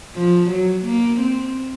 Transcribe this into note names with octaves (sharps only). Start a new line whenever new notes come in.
F3
F#3
A#3
C4